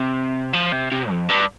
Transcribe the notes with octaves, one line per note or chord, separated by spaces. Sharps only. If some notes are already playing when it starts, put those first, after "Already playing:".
Already playing: C3
F3
C3
C3
F2
G2